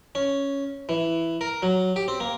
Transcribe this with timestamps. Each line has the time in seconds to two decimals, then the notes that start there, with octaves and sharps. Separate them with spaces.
0.15 C#4
0.89 E3
1.41 A#4
1.63 F#3
1.96 G4
2.08 C4
2.20 A#3